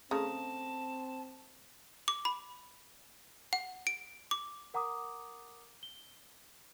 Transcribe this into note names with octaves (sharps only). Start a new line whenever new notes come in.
C#3 A3 C4 A5 A#5 D#6
D6
B5
F#5
D7
D6
A#4 F#5 A#5 D6 D#6
G7